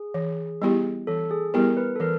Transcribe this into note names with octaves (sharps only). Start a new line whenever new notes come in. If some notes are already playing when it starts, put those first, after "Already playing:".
Already playing: G#4
E3
G3 B3 E4 G4
E3 A4
G#4
G3 B3 E4 G4 A#4
B4
A4
E3 A#4